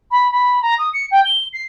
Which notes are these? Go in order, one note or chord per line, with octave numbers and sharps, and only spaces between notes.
B5
B5
A#5
D#6
C#7
G5
G7
C7